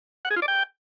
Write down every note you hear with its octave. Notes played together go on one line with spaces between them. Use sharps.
F#5
G#4
F4
D5
G5